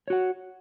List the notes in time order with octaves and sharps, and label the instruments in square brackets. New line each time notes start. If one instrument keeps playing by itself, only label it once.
[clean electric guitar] C#5
F#4
F#5